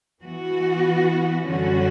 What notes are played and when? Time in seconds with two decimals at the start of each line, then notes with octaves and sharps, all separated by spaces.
0.23 E3 B3 F#4
1.47 F#2 D3 G3 C#4 F#4